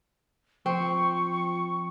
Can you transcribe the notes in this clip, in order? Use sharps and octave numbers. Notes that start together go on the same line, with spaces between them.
F3 C4 C#6